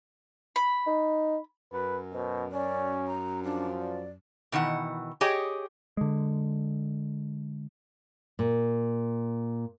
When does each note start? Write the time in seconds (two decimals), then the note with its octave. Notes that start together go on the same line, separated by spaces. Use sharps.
0.56 B5
0.87 D#4
1.73 F#2 B4
2.13 B2 C5
2.52 C#4 D5
3.08 A#5
3.44 F3 D4
3.79 D5
4.52 B2 D#3 E3 F#5
5.21 G4 G#4 C#5 D#5 G5
5.97 D3 G#3
8.39 A#2